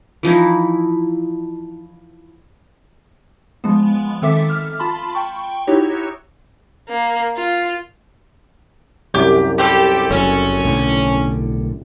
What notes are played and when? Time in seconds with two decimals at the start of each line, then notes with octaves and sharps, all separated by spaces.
0.23 E3 F3 D#4 E4
3.64 F3 G#3 B3
4.22 D#3 C4 A4 E5 D6 B6
4.50 F6
4.79 F4 A5 B5 C6
5.15 G5 C#6
5.67 D#4 E4 F#4 G4 C#5
6.89 A#3
7.37 F4
9.14 C2 F#2 G4 D6 G6
9.58 G4 A4 C5 B5
10.11 F#1 F#3 C#4
10.63 B1 A2 D3